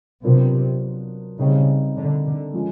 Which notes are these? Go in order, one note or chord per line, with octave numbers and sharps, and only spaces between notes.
C3 F#3 B3 D4 F4 A#4
C#3 G3 C4 D#4
D3
D3
F3 G#3 C#4 F4